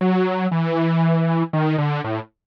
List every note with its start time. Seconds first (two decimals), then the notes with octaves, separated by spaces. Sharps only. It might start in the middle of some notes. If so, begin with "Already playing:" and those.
0.01 F#3
0.51 E3
1.53 D#3
1.78 D3
2.04 A2